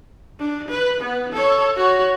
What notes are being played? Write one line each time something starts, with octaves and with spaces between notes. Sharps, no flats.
D4
B4
B3
A4 C#5
F#4 C#5